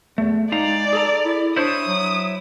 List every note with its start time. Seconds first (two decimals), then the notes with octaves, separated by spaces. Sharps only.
0.18 E2 A3
0.52 G#3 D#4 D5 F5 A#5
0.93 G#4 A4 A#5
1.25 E4
1.56 D4 E4 C5 C#5 D#6
1.87 F#3